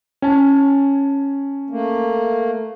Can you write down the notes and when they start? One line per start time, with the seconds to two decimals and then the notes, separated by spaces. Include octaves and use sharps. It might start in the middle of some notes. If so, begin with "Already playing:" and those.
0.22 C#4 G#5 A5
1.70 A3 A#3